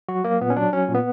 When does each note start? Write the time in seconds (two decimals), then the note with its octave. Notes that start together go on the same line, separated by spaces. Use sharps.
0.09 F#3 F#4
0.24 F#3 A#3
0.41 A#2 B3
0.50 C#4
0.57 F#3 D4
0.73 F#3 C#4
0.89 A#2
0.95 B3